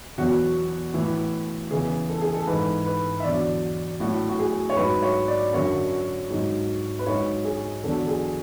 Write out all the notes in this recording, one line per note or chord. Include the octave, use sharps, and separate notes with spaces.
E2 B2 F#3 F#4
A2 E3
E2 C#3 E3 G#4
A4
G#4
A4
G#2 E3 B4
B4
E5
E2 D3 F#3 D5
A2 F#3 F#4
F#4
G#4
C#5
G#2 F#3 B4
C#5
D5
F#2 D3 F#3 C#5
G#2 F#3
B4
G#2 F#3 C#5
G#4
E2 D3 F#3 A4
G#4